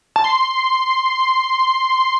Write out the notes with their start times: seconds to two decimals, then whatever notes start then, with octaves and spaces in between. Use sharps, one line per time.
0.16 A5
0.24 C6